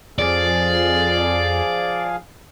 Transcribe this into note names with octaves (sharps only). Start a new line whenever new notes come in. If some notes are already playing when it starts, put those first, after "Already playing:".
F2 F3 G#4 D5 F5